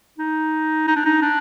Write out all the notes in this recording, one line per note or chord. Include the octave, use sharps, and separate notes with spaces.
D#4
D#4
D4
D#4
D4